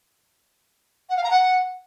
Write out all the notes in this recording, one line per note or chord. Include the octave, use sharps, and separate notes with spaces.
F#5
F5
A#5
F#5